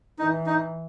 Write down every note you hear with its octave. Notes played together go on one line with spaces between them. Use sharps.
E3 D#4
D#4